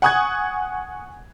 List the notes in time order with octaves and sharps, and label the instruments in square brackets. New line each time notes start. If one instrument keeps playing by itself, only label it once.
[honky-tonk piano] F#5 G#5 C#6 D#6 F#6 G#6